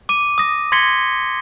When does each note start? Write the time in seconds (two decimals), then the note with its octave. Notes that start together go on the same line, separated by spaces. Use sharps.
0.09 D6 D#7
0.38 D#6 A#6
0.72 C6 G#6 A#6 B6 C#7 G7